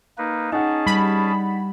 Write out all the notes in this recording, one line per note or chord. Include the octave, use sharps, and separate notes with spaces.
A#3 D#4 B4
C#4 D#4 G#4 F#5 A5
G3 B5